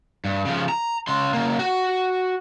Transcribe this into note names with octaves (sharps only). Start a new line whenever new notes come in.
G2
C#3 F3
A#5
C#3 C6
C#3 A#3
F#4